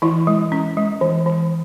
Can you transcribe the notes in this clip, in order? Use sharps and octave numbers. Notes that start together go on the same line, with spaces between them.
E3 E4
G#3
C#4
G#3
E3
E3